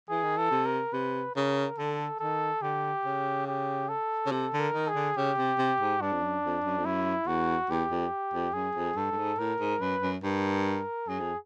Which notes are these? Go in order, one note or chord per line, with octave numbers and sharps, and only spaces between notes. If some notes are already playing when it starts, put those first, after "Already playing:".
E3 G#4
D#3
E3 A4
C3
A#4
C3 B4
C#3 A#4
D3 A4
D#3 A4
D3 G4
C#3
G4
A4
C#3
C3 A4
D3
A#4
D#3
G#4
D3
C#3 G4
C3
C3
G#2
G2 D4
F2
F#2
F2
F#2
F2
F#2 E4
E2 F#4
E2 G4
F2
F2
F#2 G#4
F2
G2 A4
G2
G#2
A2 A#4
G#2
F#2 B4
F#2
G2 A#4
F#2 G#4
F2